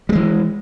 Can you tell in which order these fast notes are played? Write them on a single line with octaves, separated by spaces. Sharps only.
G3 G#3 E3